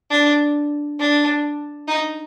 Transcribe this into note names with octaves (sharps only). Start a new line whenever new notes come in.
D4
D4
D#4